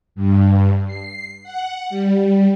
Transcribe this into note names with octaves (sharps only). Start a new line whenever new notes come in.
G2
C7
F#5
G3